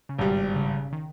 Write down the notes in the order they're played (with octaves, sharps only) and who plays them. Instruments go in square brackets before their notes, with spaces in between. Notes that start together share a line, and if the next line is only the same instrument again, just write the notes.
[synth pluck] C#3
[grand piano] G#1 G2 G3 [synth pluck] B2
[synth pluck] C#3
C#3
D#3